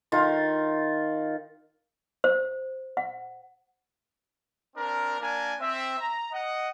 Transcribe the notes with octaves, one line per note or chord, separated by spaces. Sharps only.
D#3 F4
C5
F#5
C4 D4 A#4
A#3 D4 A#4 G#5
C4 E5
A#5
D#5 F#5